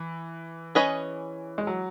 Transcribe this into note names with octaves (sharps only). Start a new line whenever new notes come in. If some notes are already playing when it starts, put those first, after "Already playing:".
Already playing: E3
C#4 G#4 B4 D#5
G#3
F#3